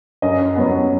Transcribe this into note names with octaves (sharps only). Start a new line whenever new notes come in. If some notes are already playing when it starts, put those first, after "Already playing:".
F#2 D#5
F#3 B3